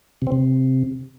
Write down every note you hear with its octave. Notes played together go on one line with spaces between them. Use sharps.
C3
C4
C3